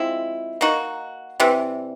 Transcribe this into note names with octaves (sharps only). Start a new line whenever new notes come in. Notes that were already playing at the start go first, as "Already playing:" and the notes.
Already playing: F3 G#3 C4 E4
A#3 D#4 F#4
C3 E3 G3